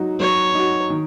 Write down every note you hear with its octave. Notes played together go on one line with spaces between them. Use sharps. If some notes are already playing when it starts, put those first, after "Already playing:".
Already playing: F#3 D#4 F#4
F#3 C#5
D#4 F#4
D#3